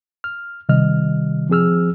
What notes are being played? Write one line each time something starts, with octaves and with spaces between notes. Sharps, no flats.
F6
C3 D#3 G3 D#5 F6
F3 C4 G#4 E6 F6